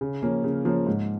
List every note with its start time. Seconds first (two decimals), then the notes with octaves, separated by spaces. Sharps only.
0.01 C#3
0.22 F3 A#3 C#4
0.44 C#3
0.65 F3 A#3 C#4
0.86 G#2